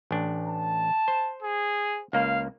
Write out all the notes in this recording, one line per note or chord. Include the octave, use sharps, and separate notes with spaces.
A1 D4
A5
C5
G#4
C#2 A#3 F5